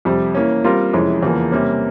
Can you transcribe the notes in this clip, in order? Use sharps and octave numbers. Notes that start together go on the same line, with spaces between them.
F2 C3 G3
E3 A#3 C#4
G3 C4 F4 A#4
F2 C3 E3 G#3 C#4
E2 C#3 F3 A#3
C3 G3 A#3 C#4